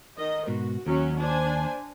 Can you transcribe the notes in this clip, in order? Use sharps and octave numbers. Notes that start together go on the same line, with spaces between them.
D#3 D#5
G#2 B2 F#4
D#2 F#3 C#4 F#4
D4 C5 G#5